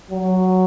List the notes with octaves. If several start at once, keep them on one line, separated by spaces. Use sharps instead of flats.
F#3